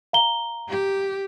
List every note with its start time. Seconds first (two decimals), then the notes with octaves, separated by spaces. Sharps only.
0.13 F5 A#5 G7
0.70 G4